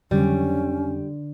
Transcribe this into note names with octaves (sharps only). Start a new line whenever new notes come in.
F2 D3 F#3 G3 C#4